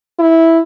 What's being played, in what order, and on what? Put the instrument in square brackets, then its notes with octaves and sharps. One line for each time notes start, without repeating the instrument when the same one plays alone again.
[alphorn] E4